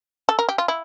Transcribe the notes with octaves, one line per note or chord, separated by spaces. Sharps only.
A4
A#4
G4
F4
E4